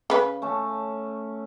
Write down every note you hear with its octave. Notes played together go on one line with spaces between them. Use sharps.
C#3 B4
A3 C#4 A5